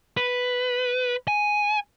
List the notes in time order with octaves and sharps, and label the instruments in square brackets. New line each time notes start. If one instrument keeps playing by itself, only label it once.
[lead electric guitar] B4
G#5